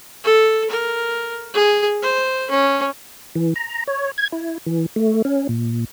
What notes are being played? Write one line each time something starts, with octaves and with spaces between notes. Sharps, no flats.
A4
A#4
G#4
C5
C#4
E3
A#5
C#5
G#6
E4
E3
A3
C#4
A#2